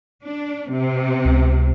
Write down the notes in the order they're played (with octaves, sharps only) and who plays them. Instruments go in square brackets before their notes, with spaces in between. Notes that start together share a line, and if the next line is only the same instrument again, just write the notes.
[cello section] D4
C3
[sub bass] C#2